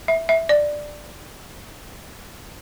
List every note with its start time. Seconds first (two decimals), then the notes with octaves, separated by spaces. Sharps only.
0.08 E5
0.29 E5
0.49 D5